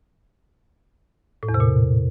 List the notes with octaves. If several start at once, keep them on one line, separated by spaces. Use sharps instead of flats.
A2
E2
C3
A#2